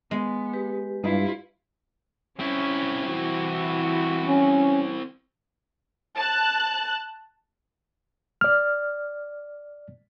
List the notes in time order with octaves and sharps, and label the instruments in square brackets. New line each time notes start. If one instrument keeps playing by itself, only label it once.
[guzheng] G#3 [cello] B3
[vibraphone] G4 B4
[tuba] G2 [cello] E4 F4
[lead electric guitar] C4 E4 [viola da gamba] C#4
[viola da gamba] E3 F#4
[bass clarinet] C#4
[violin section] A5 F#6
[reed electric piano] D5 F6